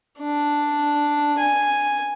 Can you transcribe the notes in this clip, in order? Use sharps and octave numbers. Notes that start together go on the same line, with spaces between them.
D4
G#5